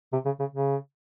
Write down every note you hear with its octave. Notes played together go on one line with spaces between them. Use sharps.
C3
C#3
C#3
C#3